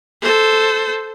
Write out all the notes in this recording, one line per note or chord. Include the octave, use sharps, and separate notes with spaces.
A4 C5